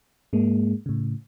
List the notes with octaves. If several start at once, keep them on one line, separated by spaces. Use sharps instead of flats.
G#2 G#3 A#3
A2 C#3